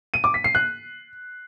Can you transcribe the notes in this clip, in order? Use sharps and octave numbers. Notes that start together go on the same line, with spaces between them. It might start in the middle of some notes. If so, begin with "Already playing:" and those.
D#7
D6
B6
C7
F#6